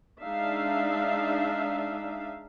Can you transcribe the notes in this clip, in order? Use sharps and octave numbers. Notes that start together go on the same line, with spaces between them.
G#3 D4 D#4 E5 F5